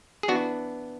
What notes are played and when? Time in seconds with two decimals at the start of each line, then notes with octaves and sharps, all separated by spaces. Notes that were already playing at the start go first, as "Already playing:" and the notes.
0.23 G#4
0.28 E3 B3 D4 F#4